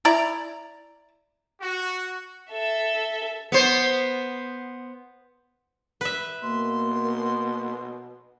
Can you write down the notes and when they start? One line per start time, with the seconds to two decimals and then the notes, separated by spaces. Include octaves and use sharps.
0.05 E4 D5 A#5
1.61 F#4
2.51 A4 E5
3.52 B3 C5
6.01 B4 E5
6.42 B2 A#3 C6